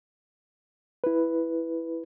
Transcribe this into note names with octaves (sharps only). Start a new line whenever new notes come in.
E4 B4